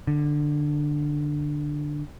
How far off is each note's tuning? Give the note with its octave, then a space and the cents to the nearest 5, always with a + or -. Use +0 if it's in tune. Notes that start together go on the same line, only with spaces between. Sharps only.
D3 +10